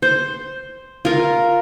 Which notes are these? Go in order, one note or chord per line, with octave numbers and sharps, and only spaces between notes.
C5
F4 A#4